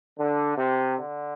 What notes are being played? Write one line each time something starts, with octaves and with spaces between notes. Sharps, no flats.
D3
C3
D3